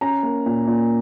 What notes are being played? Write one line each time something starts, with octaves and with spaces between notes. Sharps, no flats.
C#4 A#5
A#3
A#2
A#2